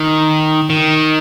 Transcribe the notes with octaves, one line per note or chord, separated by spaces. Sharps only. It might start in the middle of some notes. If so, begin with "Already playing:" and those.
Already playing: D#3
D#3